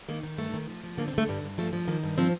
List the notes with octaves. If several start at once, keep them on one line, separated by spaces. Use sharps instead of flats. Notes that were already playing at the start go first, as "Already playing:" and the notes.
D#3 A#3
D#3
G2 A3
D#3
F3
F3
D3 A#3
C4
D3 A3
G2 G3
G2
F3 A3
F3
D#3 A#3
G2
F3 C4